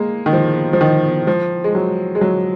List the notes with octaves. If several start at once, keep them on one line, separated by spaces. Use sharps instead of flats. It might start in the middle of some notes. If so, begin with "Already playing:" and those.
Already playing: G#3 A#3
D#3
F3
F3
D#3
F3
G#3
F#3
G#3
F#3